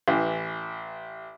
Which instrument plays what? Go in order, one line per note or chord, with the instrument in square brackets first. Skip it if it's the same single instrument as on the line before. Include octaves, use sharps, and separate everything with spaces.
[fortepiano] A1 E3